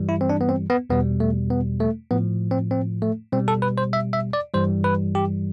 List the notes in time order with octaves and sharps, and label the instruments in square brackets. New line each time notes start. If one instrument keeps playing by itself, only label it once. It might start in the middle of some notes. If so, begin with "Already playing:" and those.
Already playing: [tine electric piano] G2 E3 G3
E4
C4
D4
B3
C4
B3
E2 B2 G3 B3
A3
B3
A3
A2 F3 B3
C4
C4
A3
B2 G3 C4
A4
B4
C5
E5
E5
D5
G2 E3 G3 C5
B4
G4